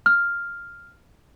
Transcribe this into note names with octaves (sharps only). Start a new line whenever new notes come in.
F6